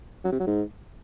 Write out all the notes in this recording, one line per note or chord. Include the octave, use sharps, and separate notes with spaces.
F#3
C3
F#3
G#2